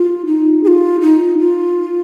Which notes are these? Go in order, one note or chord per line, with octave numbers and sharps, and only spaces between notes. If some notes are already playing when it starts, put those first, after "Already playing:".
Already playing: F4
D#4
G#4
F4
D#4
F4